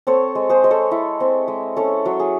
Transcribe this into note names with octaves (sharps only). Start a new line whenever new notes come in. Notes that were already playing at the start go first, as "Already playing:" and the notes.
C4 A4 C#5
G#3
G#4 C5
G#3 C5
A4 C#5
E4
C4
G#3
C#4 A4 C#5
F#3
G#4